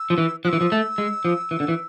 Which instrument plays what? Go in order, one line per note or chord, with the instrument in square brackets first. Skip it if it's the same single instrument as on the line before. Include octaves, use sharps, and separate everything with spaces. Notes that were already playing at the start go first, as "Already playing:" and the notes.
Already playing: [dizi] E6
[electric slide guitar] F3
E3
[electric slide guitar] F3 [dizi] F#6
[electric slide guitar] E3 [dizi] E6
[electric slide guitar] F3
A3
G#3
F3
E3
D3
E3